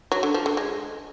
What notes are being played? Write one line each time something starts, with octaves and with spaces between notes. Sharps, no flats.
F#3
D3
F3
D3
G#3